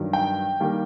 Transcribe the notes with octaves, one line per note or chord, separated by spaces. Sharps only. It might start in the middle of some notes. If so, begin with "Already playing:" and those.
Already playing: G2 D#3 F#3
G5
D#3 G3 A#3